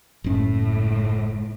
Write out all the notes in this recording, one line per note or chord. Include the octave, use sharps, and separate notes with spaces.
F#1 A2 C#4